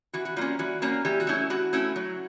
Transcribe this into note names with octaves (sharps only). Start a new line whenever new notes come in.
E3 F#4
F#4
G3 A#3 C#4 F4
E3 F#4
G3 A#3 C#4
E3 G4
F#4
A3 C#4 E4
E3 F#4
A3 C#4 E4
F#3